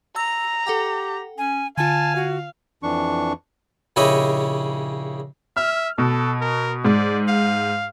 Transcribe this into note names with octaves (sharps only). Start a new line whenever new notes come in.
A#5 E6
G4 A4 F#5 G5
C#4 G#5
D3 F4 F5 G#5 A5
F#4
F2 E3 D4 C#6
A#1 C#3 E4 G4 C#5 D#5
E5 F6
B2 A4
A#4
G#2 D5
F5